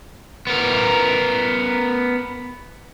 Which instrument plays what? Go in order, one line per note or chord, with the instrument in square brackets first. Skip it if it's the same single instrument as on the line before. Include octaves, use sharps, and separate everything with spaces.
[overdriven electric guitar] B3 A#4